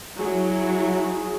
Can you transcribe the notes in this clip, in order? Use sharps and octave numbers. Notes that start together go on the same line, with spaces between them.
F#3 E4 G#4